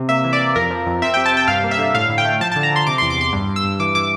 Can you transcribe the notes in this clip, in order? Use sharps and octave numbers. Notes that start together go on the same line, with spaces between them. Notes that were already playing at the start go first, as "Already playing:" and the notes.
Already playing: C3
A#3 E5
E3
D5
A#3
F2 A#4
F3
F2
C4 E5
C3 G5
A5
C3 G5
G2 F5
A#3
E5
D3
A2 F5
A2
G5
A3
F3 A5
D3 A5
A#5
D3 C6
C3 D6
E2 C6
D6
E2 C6
G2
G2
E6
G2
E3 D6
E3 D6